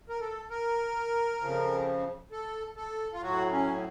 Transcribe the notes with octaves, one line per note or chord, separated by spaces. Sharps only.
A#4
A4
A#4
F2 C#3 F3
A4
A4
F4
A2 F#3 F#4
C#4